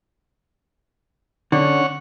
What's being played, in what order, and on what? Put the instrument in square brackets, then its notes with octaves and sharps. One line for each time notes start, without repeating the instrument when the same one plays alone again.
[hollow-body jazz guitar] D3 [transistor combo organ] C#4 C#5 F#5